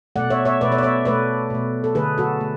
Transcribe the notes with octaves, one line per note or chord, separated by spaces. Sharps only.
B2 A3 D5 F#5
C#5 E5
C#5 E5
B2 A3 B4 D5
C#5 E5
D5
C#5 E5
B2 A3 B4 D5
B2 A3
A4
D3 A3 G#4 B4
F#4 A4
A3